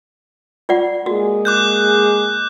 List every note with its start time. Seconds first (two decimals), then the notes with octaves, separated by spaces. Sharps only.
0.69 F4 D5 F#5
1.06 G#3 A#3 F#4 G#4
1.45 D6 F#6 G6